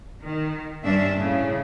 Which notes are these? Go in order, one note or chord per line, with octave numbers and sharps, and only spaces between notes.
D#3
G2 C#4 D4 E5
A2 C#3